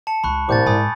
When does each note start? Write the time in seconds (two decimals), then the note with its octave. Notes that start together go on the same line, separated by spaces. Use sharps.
0.07 A5 C#7
0.24 C#2 B5 C#6 F#6
0.49 C2 A2 C3 D6 G6 A6
0.66 G#2 G#5 B5 D#6